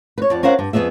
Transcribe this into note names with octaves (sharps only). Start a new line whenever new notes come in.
B4 C#5
F2 D5 F#5
C#4 A#4 C5 F5 F#5
G2
F2 D#3 B3 G#4 E5